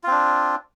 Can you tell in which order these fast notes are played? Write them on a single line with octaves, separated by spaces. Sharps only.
F4 C4 D4